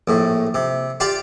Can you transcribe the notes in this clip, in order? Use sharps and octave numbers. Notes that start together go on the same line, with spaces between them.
A#1 A2
C3
F4 G4 D5